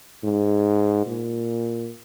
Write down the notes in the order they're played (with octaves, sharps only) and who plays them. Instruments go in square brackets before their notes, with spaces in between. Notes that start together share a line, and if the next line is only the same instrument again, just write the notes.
[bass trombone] G#2
A#2